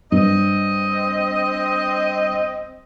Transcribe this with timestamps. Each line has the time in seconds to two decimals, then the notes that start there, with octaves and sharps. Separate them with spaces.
0.12 G2 C4 D#5